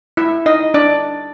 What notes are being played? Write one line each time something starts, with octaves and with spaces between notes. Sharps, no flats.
E4 E5
D#4 D#5
D4 D5